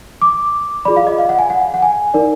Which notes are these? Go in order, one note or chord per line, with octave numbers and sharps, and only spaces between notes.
D6
F4 G#4 D5 B5
F5
D#5
F5
F#5
G#5
F#5
F#5
G#5
D#4 A#4 D5